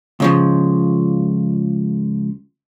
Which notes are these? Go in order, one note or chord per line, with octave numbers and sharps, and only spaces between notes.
C#2 C#3 F3